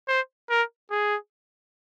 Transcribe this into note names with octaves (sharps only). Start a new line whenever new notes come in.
C5
A#4
G#4